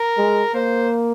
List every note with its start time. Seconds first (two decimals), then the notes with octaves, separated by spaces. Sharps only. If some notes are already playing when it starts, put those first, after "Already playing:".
Already playing: A#4
0.17 G#3
0.54 A#3 C5